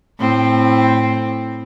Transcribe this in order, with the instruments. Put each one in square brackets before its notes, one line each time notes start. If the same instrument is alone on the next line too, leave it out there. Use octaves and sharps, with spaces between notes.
[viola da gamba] A2 C4